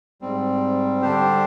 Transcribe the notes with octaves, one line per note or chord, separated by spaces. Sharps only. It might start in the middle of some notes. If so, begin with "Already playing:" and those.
G#2 G3 C4
D3 G3 D4 G4 C5